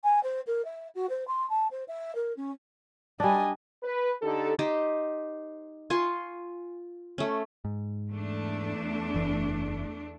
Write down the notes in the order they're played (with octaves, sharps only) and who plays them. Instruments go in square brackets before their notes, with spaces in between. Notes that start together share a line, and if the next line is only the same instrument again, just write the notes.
[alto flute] G#5
C5
A#4
E5
F#4
C5
C6
A5
C5
E5
A#4
C#4
[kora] G3 D4 [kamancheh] D#5 G#5
[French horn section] B4
D3 D#4 G4 A4
[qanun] D#4 G4 C5 D#5
F4 G#5 C6 C#6
A3 C#4
[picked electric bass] G#2
[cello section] E2 A3 D4
[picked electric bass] F#1 E3